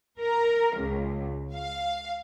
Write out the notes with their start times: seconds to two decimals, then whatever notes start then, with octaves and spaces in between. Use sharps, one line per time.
0.20 A#4
0.77 C#2
1.55 F5